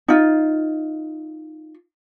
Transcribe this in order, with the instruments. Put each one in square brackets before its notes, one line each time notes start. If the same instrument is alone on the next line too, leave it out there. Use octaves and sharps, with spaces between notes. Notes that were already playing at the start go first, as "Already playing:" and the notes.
[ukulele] D#4 F4